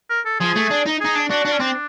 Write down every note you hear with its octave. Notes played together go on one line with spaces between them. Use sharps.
A#4
A4
F3 G#4
A3
D4
D#4
D#4 G#4
D4
D4 F#4
D4
C#4
C4 D4